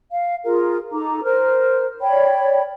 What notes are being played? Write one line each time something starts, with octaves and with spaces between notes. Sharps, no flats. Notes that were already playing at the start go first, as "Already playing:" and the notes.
F5
F4 G#4 A#4
D#4 A4 A#5 D6
A#4 C5 F6
C#5 D5 G5 B5